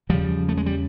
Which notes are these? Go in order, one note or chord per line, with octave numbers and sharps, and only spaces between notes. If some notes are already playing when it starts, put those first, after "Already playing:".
E2 C#3 F3 G3
A3
G#3
G3